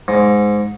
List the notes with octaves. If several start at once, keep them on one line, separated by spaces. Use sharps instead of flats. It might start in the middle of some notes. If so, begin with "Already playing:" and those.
G#2